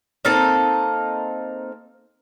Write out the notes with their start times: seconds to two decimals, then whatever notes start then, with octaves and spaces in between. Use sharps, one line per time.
0.25 A#3 C4 D#4 A4